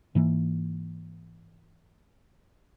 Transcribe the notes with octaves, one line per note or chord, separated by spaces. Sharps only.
G#2 E3 A#3